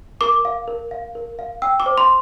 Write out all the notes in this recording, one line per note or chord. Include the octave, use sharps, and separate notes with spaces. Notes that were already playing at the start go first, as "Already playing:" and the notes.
A#4 D6
F5
A#4
F5
A#4
F5
G5 E6
D6
C5
C6